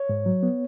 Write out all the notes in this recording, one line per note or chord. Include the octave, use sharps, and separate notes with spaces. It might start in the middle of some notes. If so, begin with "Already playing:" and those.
Already playing: C#5
G#2
F#3
B3